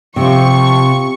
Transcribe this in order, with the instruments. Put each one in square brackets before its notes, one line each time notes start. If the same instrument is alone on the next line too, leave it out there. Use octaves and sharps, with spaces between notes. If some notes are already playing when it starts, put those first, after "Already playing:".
[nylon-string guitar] C3 [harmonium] F3 [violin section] C#6